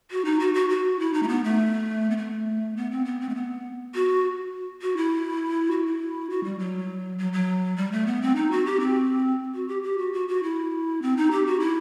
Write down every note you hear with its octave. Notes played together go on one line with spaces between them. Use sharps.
F#4
D#4
F#4
F#4
F#4
E4
D#4
A3
B3
A3
B3
A3
B3
C4
B3
C4
A3
B3
F#4
F#4
E4
F#4
E4
F#4
G3
F#3
F#3
F#3
G3
A3
B3
C4
D#4
F#4
G4
C4
F#4
G4
G4
F#4
F#4
F#4
E4
C4
D#4
G4
F#4
E4